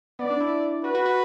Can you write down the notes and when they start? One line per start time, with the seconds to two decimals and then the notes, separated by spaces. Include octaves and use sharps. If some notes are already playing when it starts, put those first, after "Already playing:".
0.19 B3 D5
0.30 D4
0.40 E4
0.84 F#4 B4
0.95 F#4
1.06 F#4